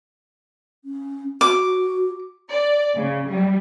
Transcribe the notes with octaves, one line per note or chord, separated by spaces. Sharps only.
C#4
F#4 D6
D5
C#3
G3